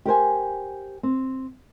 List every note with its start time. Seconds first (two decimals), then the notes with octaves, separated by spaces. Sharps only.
0.06 G4 A#4 C5 G#5
1.03 C4